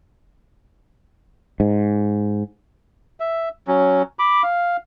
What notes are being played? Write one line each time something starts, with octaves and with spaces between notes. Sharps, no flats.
G#2
E5
F#3 C#4
B5 D6
F5